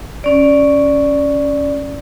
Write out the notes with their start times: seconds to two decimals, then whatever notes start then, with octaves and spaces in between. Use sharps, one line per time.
0.24 C#4 D5